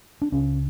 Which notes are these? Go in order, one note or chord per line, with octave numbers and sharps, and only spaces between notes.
D4
C#2 C#3 C#4